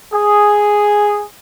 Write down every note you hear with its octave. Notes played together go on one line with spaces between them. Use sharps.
G#4